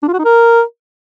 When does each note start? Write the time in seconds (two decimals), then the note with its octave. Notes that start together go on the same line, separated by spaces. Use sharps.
0.03 D4
0.08 F4
0.14 F#4
0.19 D#4
0.25 A#4